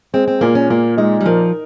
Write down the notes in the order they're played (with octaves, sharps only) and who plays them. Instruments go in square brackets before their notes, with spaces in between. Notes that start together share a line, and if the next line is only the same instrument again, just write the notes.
[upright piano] G#3 [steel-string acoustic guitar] C4
[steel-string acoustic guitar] C4
[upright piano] A#2 [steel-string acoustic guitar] A#3
[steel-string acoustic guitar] C#4
[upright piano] A#2 [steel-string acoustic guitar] A#3
[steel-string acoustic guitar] G#3 [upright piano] D#4
[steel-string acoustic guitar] G3
[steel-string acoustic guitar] F3 [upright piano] A#4